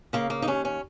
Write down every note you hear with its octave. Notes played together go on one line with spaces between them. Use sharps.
C#3 A#3
A#3
D#4
D#2 C#4
C#4